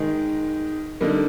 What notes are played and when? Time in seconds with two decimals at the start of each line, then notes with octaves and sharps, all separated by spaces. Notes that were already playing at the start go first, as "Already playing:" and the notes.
Already playing: D#3 G#3 D#4
1.01 D3 G3 A#3 D#4